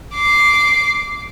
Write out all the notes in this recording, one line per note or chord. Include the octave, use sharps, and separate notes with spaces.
D6 C7